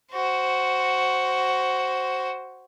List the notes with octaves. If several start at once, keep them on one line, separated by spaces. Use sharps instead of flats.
F#4 C5